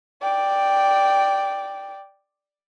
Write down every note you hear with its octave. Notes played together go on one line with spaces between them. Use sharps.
D5 G5